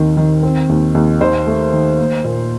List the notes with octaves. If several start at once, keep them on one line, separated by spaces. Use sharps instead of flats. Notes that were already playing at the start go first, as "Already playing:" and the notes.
Already playing: D#2 D#3 C4
D#3
C4
D#2
D#2
D#3 C5
A3
D#3
A#3
A#2